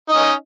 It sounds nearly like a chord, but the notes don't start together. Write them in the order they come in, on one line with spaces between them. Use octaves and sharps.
D#4 D#5 C#4